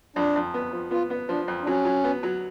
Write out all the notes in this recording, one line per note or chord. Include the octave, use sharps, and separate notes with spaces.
F2 D4
F2
B3
F3
B3 F4
B3
F3 D4
F2
D4
F#3 C#4
F#3
B3
F#3